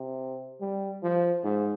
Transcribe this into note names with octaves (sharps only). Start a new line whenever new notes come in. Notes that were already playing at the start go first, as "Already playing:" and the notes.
Already playing: C3
G3
F3
G#2